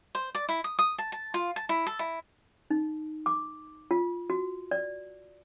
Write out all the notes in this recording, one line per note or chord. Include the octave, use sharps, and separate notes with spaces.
C5
D5
E4
D#6
D#6
A5
A5
F4
A5
E4
A4
E4
D#4
D6
F4
F#4
D5